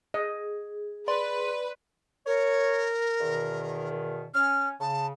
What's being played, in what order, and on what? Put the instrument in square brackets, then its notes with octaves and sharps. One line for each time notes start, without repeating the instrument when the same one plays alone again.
[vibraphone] G#4 [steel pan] D#5
[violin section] B4 [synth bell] D5 C6
[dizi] A#4 [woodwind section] C#5
[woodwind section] E2 B2 D#3
[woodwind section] C#4 [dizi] F6
[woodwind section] C#3 [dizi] A5